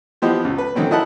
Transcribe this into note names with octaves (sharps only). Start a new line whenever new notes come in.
E3 F3 B3 G4 C5 D#5
C#2
B4
D3 D#3 F#3 C4 C#4
E4 A#4 D#5 F#5 A5 B5